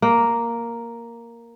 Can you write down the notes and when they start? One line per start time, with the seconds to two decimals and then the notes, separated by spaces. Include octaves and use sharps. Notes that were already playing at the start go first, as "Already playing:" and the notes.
0.02 A#3